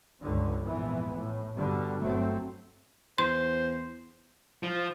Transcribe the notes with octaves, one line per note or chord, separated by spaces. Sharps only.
C#2 G2 D3
A#1 F2 G#2 E3 B3
A2
G2 B2 D3 G3
G1 F#3 A3 C4
E2 C5 C6
F3